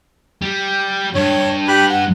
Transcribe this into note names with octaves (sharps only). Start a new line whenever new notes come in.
G3
G2 C#5
G4 B5 F#6
F#5